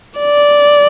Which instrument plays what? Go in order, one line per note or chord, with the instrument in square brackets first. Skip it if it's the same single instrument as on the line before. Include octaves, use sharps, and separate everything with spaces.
[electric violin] D5